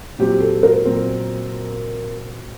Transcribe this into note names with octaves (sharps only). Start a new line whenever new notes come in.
A#2 F#3 C4 G4
A4
A#4
A#2 F#3 C4